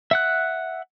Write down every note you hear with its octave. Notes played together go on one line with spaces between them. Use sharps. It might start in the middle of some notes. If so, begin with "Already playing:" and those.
E5 F#5 F#6